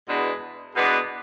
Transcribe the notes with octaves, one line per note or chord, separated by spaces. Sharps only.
E2 B2 G#3 B3 D4
E2 B2 G#3 B3 D4